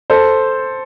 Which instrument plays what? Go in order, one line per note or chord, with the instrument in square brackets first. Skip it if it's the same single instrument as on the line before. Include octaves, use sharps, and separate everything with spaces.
[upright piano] A4 C5